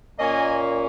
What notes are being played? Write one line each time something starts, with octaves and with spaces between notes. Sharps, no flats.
A#2 A#3 C#4 D#5 G#5